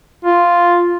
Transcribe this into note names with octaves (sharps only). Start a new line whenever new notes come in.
F4